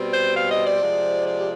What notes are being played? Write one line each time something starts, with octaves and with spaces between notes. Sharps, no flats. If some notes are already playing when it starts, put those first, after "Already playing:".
Already playing: B2 G3 C4
C5
F5
D#5
D5
C3 F3 G#3
D5
G4